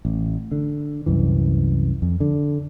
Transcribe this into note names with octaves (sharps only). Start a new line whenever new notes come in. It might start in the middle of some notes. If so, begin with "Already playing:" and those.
A1
D3
C2 F#2 E3
F2
D3